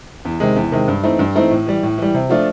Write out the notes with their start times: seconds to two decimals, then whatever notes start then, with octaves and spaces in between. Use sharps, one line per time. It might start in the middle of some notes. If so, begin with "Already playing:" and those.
0.25 E2
0.40 C3 D#3 G#3
0.56 E2
0.72 C3 D#3 G#3
0.88 G2
1.03 E3 A3 C4 D#4
1.19 G2
1.35 E3 A3 C4 D#4
1.51 A2
1.67 E3 G3
1.83 A2
1.98 E3 G3
2.14 C3
2.30 F3 A3 D4 F4